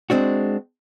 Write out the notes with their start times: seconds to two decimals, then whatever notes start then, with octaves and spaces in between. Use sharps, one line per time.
0.10 G#3 C4 D4 F#4